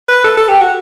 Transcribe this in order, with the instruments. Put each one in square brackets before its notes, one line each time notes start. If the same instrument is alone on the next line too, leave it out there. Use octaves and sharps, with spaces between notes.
[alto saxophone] B4
A4
A4
G4
F#4